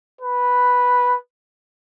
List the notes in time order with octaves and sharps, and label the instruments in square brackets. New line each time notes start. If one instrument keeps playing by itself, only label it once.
[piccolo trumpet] B4